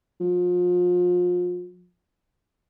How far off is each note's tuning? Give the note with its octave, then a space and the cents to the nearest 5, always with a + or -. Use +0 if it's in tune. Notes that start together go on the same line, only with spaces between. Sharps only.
F3 +35